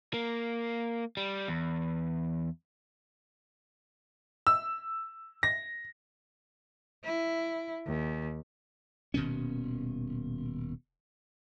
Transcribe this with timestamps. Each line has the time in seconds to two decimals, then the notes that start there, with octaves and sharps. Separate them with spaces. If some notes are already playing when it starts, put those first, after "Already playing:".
0.14 A#3
1.17 G3
1.48 E2
4.47 E6
5.43 A#6
7.04 E4
7.87 D#2
9.14 D#1 B2 D#3 C#4